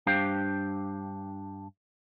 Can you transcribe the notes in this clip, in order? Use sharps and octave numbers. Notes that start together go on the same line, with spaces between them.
G2 D4 G4 C5 F5 G5